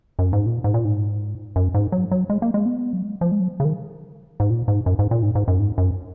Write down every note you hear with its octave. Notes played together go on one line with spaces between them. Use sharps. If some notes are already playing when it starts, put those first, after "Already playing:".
F#2
G#2
A#2
G#2
A#2
G#2
F#2
G#2
F#3
F#3
G#3
A#3
G#3
B3
F#3
G#3
F3
G#3
F#3
C#3
D#3
G#2
A#2
G#2
F#2
G#2
A#2
G#2
G#2
F#2
G#2
F#2